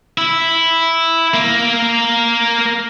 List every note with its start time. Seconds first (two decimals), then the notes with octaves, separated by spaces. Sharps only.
0.18 E4
1.34 A#3